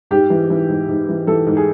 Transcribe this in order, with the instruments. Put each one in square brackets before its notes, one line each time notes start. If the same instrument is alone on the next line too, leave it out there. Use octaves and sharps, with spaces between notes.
[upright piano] G#2 G4
E3
E3
G#2
G#2
E3
E3 A4
G#2
G#4